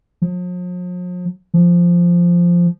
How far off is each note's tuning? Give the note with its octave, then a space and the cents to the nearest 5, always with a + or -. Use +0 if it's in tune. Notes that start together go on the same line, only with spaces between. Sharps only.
F3 +45
F3 -5